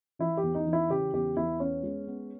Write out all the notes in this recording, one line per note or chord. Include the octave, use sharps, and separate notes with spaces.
E3 E4
G4
E2
D#4
E3
E4
C#3 G4
E2 G4
E2 E4
B3 C#4
G#3
B3